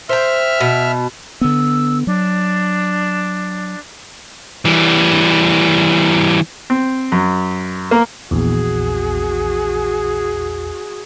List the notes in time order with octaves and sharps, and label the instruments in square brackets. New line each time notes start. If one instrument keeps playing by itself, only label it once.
[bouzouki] C5 G5 [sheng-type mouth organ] E5 F6
[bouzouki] B2
[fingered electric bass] D3 B3 [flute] E6
[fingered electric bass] F#3 [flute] D4
[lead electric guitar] E3 G3
[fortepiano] C4
F#2
A#3
[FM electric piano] A#1 E2 [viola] F#4 G#4